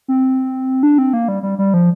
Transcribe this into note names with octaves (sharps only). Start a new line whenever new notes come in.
C4
D4
C4
A#3
G3
G3
G3
F3